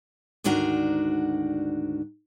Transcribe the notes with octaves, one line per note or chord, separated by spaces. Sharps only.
D2 G#2 D#3 D4 F#4 A#5